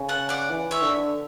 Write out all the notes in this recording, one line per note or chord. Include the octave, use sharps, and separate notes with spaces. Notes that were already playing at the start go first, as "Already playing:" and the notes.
Already playing: C#3
F#5 A5
D5 F#5
E3
C#5 E5
D3